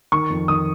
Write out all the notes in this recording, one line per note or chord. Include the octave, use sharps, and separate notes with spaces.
D#3 C#6
F2
D#3 D#6